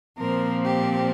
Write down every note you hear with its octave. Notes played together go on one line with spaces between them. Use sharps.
A#2 F3 C4 A#4
G4